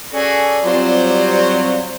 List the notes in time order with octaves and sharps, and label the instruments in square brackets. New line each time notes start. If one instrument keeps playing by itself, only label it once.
[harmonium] C#4 A4 [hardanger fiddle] F#4 G#4 [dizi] D5
[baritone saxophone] F#3 [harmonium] G3 C4 F4 [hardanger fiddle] C5